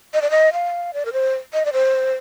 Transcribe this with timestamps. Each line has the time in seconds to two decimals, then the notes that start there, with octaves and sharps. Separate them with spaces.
0.14 D#5
0.22 D5
0.31 D#5
0.53 F5
0.94 D5
1.05 A#4
1.13 C5
1.54 D#5
1.65 D5
1.73 C5